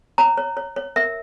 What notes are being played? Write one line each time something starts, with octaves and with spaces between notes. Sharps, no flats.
C#5 A#5
C#5
C#5
C#5
A#4 E5